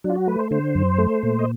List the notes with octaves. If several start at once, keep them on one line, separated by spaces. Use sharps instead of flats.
F#3 D4
F4
F#4
A3 B4
C5
D3 C5
F#2
A3
A#2
D#5